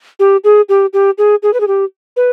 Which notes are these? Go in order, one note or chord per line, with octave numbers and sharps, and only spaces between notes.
G4
G#4
G4
G4
G#4
G#4
B4
G#4
G4
B4